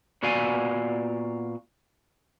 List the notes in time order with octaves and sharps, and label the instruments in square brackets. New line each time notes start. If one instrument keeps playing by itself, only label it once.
[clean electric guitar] A#2 B3 F#4 D5 F5 G#5